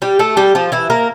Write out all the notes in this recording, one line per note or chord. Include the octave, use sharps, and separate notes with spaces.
G3 G4
A3 A4
G3 G4
F3 F4
E3 E4
A#3 A#4